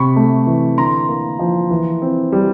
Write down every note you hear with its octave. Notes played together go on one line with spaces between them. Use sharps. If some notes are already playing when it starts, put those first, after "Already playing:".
Already playing: C3 B5 C#6
A3
E3
D3 A#5 C6
A#3
F3
E3
C4
G3